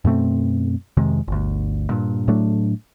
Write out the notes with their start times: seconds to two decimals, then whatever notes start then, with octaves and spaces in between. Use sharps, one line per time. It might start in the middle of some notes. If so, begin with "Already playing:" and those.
0.05 F#2 B2 A3 C4
0.97 F2 C3 D#3 G#3
1.28 G1 D2
1.89 G2 A#2
2.28 A2 F#3 A3 D4